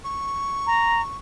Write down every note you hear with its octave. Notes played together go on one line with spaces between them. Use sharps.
C#6
A#5